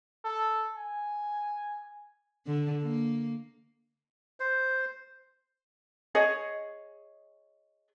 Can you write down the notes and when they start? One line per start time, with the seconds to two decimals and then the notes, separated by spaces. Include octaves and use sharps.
0.25 A4
0.76 G#5
2.46 D3
2.83 A#3
4.40 C5
6.15 G#4 C#5 D#5